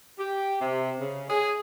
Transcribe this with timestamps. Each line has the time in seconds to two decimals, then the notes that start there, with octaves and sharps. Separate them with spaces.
0.19 G4
0.61 C3
1.00 C#3
1.30 G#4